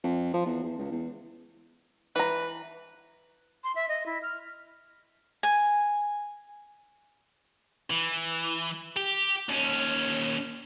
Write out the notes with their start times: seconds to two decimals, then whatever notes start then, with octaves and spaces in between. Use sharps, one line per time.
0.04 F2
0.33 F3
0.46 E2
0.63 E2
0.78 C#2
0.91 E2
2.16 E3 B4 A#5
3.64 C6
3.75 E5
3.89 D#5
4.06 E4
4.23 F6
5.43 G#5
7.90 E3
8.96 G4
9.49 D#2 C#4